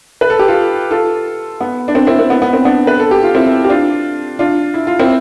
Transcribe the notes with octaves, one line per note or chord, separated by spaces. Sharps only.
B4
A4
G4
F4 A4
F4 A4
B3
D4
C4
C4 E4
C4
B3
B3
C4
B3 D4
B4
A4
G4
F4
C4 E4
G4
D4 F4
D4 F4
E4
F4
C4 E4